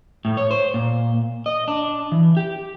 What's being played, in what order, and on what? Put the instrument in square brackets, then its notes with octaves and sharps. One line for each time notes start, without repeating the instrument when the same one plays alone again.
[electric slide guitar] A2
C#5
C5
A#2
D#5
D4
E3
G4